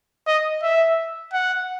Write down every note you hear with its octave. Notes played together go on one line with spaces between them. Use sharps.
D#5
E5
F#5